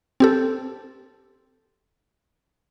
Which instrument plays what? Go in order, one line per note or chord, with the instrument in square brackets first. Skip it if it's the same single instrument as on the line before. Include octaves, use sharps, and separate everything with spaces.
[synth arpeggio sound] C4 G4 A4